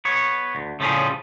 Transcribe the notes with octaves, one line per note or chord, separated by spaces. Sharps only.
B3 C#5
D2
A2 C#3 F3 G3 C#4 G#4